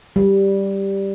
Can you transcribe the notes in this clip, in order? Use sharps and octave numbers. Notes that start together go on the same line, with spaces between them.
G3